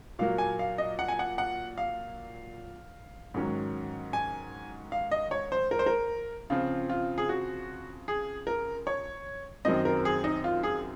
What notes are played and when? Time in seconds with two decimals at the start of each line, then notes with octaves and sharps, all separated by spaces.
0.19 A#2 F#3 A#3 F5
0.38 G#5
0.59 F5
0.78 D#5
0.99 F#5
1.08 G#5
1.19 F#5
1.38 F#5
1.78 F5
3.34 G#2 D#3 F#3 C#4
4.13 G#5
4.92 F5
5.11 D#5
5.31 C#5
5.52 C5
5.71 A#4
5.79 C5
5.86 A#4
6.50 C#3 F3 C4 F4
6.90 F4
7.18 G#4
7.29 F#4
8.08 G#4
8.47 A#4
8.87 C#5
9.65 F#2 D#3 F#3 C4 D#5
9.85 A#4
10.05 G#4
10.24 D#4
10.44 F4
10.63 G#4